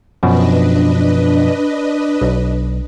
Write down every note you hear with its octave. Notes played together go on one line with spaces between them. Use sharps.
F#2 B2 F3 D4 B4 D#5
B1